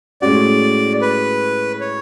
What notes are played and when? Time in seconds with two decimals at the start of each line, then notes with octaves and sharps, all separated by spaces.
0.22 A2 G#3 C#4 F#4 D5
1.01 B4
1.81 C#5